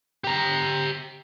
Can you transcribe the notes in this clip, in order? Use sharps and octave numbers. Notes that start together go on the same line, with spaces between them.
G4 A#5